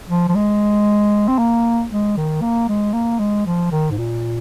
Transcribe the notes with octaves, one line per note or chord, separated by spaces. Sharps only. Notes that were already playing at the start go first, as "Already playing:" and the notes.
F3
F3
G#3
C4
A#3
G#3
D#3
A#3
G#3
A#3
G#3
F3
D#3
G#2
A#2